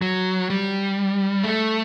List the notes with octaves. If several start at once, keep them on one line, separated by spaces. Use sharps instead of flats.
F#3
G3
A3